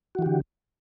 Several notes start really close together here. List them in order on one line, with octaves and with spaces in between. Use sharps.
F#4 E3 G4 D3